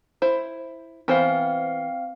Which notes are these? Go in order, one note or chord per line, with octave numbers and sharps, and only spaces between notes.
E4 C5
E3 B3 C4 C5 F5